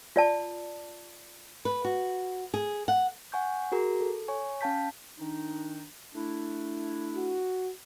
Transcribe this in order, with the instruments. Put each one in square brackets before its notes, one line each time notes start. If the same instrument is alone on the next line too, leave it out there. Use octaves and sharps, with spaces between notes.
[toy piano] F4 D5 A5
[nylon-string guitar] B4
F#4
G#4
F#5
[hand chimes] F#5 G#5 C#6 G6
F#4 G#4 A#4 A#5
A4
C#5 G#5 C#6
C#4 F5 G5 A5 G6 B6
[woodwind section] D#3 D4 D#4
A3 D4 E4
[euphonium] F#4